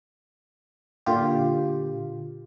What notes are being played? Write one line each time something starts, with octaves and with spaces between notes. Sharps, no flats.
A#2 D3 F4 G4